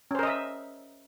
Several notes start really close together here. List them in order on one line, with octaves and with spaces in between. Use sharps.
C#4 C5 A#4 D#5 E5